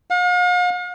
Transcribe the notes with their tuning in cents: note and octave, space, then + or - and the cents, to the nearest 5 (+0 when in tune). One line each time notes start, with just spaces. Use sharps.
F5 +45